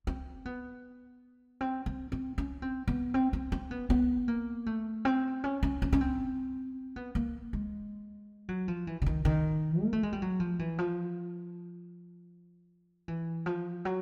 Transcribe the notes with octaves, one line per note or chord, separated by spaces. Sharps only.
C4
B3
C4
C4
C4
C#4
C4
B3
C4
C4
C4
B3
B3
A#3
A3
C4
C#4
C#4
C#4
C#4
C4
B3
A#3
G#3
F#3
F3
E3
D3
D#3
D#3
A#3
A3
G#3
G3
F#3
F3
E3
F3
E3
F3
F#3